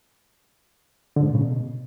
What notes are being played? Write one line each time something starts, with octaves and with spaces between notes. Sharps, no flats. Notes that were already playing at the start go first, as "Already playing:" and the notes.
D3
G#2
A#2
C#3
B2